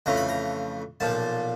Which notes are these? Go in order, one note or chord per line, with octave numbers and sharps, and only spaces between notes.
F2 C#3 E3 A3 A#5
B5
A#5
B1 A#2 F3 A5